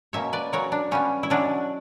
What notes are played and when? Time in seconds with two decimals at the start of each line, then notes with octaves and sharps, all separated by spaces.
0.13 B2 A#3 C#4 C#5 E5
0.33 B4 D5
0.52 C#3 F#3 B3 A#4 C#5
0.72 D4
0.91 C#3 G3 B3 C#4
1.23 E4
1.30 B2 F#3 C#4 D4